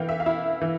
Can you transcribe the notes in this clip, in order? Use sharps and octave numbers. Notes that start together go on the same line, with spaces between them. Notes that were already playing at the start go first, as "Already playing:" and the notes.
Already playing: E3 B3 F5 G5
E5
F5
E4 E5
E3